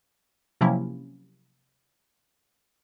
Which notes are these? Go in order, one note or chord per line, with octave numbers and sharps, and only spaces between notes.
C3 F3 F#3 A#3 C#4 E4